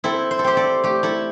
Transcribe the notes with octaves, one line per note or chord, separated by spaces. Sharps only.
C4 E4 A4
C5
A4
C4 G4 C5
A4 D5
A3 G4
E4 A4